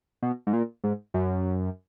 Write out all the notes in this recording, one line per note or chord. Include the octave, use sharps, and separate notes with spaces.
B2
G#2
A#2
G#2
F#2